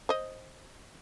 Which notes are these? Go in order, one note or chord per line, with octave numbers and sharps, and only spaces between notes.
C5 D#5